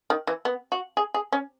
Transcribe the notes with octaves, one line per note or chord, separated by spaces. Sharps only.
D#3
E3
B3
F#4
G#4
G#4
C#4